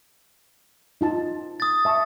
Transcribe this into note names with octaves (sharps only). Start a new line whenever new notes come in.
D#4 F4 A5
D#6 A6
E5 A5 C#6